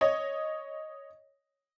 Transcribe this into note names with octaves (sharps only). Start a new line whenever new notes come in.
C#5 D#5